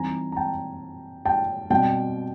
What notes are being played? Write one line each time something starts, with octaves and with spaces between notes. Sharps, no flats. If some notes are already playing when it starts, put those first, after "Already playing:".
Already playing: E3 G3 C4 D#4 G#5 A#5
A#5
G5 A5
G5 A5
B2 G3 C4 G5 A5